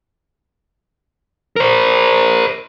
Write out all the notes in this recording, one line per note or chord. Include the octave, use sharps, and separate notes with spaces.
A#4 C5